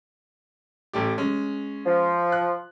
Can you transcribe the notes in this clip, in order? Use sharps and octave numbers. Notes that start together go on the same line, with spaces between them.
A1 A3 G4
G#3 C#4
F3
F#6